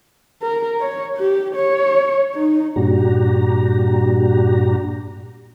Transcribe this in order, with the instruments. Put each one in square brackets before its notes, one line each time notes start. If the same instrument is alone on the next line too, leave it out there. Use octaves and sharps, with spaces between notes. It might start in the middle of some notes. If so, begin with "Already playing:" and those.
[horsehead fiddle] A#4
C#5
G4
C#5
D#4
[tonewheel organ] G2 A#2 D4 F#4 G4 A#5